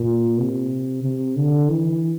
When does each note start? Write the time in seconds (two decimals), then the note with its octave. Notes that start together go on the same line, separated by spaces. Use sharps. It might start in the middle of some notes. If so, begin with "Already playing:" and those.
Already playing: A#2
0.39 C3
1.04 C3
1.37 D3
1.69 E3